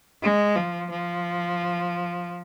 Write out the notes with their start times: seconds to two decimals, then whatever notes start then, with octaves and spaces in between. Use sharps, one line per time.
0.22 G#3
0.56 F3
0.90 F3